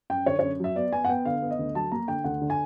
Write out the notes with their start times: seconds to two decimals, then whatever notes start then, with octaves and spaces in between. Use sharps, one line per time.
0.10 F#2 G5
0.26 D3 C#5
0.39 F#2 C#5
0.60 F#3 E5
0.76 B3 D5
0.92 B3 G#5
1.05 F#5
1.09 B3 G5
1.25 D3 F5
1.42 B3
1.51 D#5
1.59 D2
1.75 F#3 A5
1.92 A#3 A#5
2.08 D3 G5
2.24 D2 F#5
2.41 D3
2.50 G#5